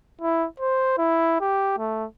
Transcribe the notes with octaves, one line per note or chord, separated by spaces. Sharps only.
E4
C5
E4
G4
A3